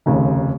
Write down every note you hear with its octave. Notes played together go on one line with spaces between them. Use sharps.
F1 D#2 C#3